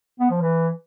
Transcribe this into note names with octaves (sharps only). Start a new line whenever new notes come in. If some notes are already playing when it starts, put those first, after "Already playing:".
B3
F3
E3